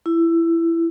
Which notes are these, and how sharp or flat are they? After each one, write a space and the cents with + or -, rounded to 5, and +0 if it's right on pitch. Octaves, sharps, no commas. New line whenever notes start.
E4 +15